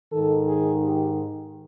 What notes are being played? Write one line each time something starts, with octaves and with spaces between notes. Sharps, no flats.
G#2 D#3 A4
G#4
G4